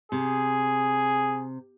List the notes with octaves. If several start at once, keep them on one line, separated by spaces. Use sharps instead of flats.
C3 G#4